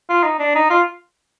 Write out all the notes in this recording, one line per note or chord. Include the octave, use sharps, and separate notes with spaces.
F4
D#4
D4
D#4
F4